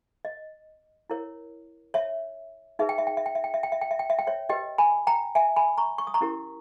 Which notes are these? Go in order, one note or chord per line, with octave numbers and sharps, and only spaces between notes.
D#5
E4 A#4 C#5
C#5 E5
D#4 G#4 B4 E5
G5
E5
G5
E5
G5
E5
G5
E5
G5
E5
G5
E5
G5
E5
G5
C#5 E5
G4 B4 D#5 G5
G#5 B5
G5 A#5
E5 G#5
G#5 B5
A#5 C#6
C#6
D#6
A#5 C#6
C#4 E4 G4 A#4